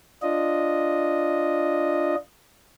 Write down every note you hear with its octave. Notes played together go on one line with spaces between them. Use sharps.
D4 F4 D#5